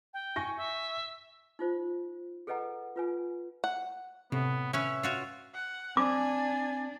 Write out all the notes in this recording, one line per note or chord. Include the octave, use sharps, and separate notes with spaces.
G5
G#5 C#6 A#6
E5
D#4 F4 C5
G#4 A4 B4 D#5 F#5 A#5
F4 B4 G#5
F#5
A2 C3 B3
C#4 B4 C#5 E5
F4 F#4 C#5
F#5
C4 D4 G#5 D6